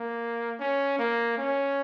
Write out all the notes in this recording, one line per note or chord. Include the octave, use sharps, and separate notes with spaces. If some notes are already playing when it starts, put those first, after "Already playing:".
Already playing: A#3
C#4
A#3
C#4